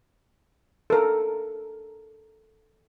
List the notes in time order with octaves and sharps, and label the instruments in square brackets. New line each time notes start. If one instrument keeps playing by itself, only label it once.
[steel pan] A4 A#4